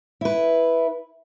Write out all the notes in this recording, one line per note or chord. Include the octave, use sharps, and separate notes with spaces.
E4 B4